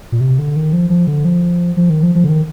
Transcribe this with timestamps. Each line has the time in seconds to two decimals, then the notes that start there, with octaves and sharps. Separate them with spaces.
0.12 A#2
0.21 C3
0.39 D3
0.56 D#3
0.73 F3
0.90 F3
1.07 D3
1.25 F3
1.77 F3
1.90 D#3
2.03 F3
2.15 F3
2.24 D3
2.29 D#3